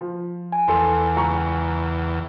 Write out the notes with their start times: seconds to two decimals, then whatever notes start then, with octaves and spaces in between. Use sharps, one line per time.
0.01 F3
0.52 G#5
0.68 E2 A4 C6
1.16 C#2 A#5 C#6